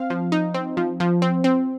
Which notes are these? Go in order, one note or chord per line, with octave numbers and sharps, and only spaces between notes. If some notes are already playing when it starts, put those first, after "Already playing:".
Already playing: C4 F5
F3
D#4
C4
F3
F3
C4
C4